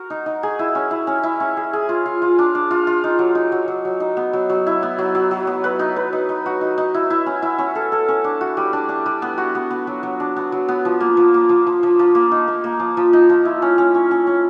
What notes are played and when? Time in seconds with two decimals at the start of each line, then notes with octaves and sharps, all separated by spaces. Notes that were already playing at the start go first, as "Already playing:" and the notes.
Already playing: F#4 A#4
0.10 D#4
0.26 D#4
0.43 G#4
0.59 E4
0.75 C#4
0.91 E4
1.07 C#4
1.23 E4
1.40 C#4
1.57 G#4
1.73 G#4
1.89 F4
2.06 F4
2.22 F4
2.39 D4
2.55 D4
2.71 F4
2.87 F4
3.04 D#4
3.19 F#3
3.35 D#4
3.52 F#3
3.68 F#3
3.85 F#3
4.00 D#4
4.17 B3
4.33 F#3
4.50 F#3
4.67 E4
4.83 B3
4.98 F#3
5.15 F#3
5.31 F#3
5.47 B3
5.64 B4
5.79 D#4
5.96 B4
6.13 D#4
6.29 D#4
6.46 F#4
6.61 D#4
6.78 D#4
6.94 E4
7.10 E4
7.26 C#4
7.42 E4
7.58 C#4
7.75 A4
7.92 A4
8.08 C#4
8.24 D4
8.41 F#4
8.57 G3
8.73 D4
8.89 D4
9.06 G3
9.22 B3
9.38 F#4
9.55 B3
9.71 B3
9.87 F#3
10.03 F#3
10.20 D4
10.36 B3
10.52 F#3
10.68 B3
10.85 F3
11.00 A#3
11.17 F3
11.34 A#3
11.49 F3
11.67 F3
11.83 F3
11.99 F3
12.15 A#3
12.32 D#4
12.48 A#3
12.64 A#3
12.80 F3
12.97 F3
13.13 D#4
13.29 F3
13.45 E4
13.62 C#4
13.78 C#4
13.95 C#4
14.11 C#4
14.27 C#4